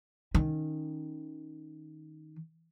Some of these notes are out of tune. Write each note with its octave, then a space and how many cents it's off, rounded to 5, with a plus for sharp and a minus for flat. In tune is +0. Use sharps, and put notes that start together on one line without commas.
D#3 +0 C#4 +0